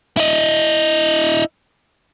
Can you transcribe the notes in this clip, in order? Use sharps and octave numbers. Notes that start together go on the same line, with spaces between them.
E4 D#5